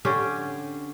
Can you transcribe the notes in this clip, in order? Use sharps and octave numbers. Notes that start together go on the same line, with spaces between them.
D3 C#4 G4